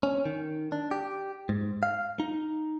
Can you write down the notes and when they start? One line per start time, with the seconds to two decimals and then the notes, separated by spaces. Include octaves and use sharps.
0.03 C#4
0.25 D#3
0.72 D4
0.91 G4
1.49 G#2
1.83 F5
2.20 D#4